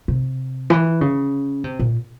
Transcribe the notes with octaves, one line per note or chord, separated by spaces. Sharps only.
C3
E3
C#3
C3
A#2